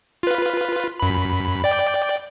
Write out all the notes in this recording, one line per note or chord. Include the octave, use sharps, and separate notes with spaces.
F4 B4
F#2 B5
D5 G5